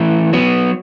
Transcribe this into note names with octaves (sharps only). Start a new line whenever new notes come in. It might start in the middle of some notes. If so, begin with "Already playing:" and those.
Already playing: E3 A3
F#3 B3